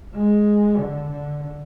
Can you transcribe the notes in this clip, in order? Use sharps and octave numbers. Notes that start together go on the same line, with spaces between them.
G#3
D3
D3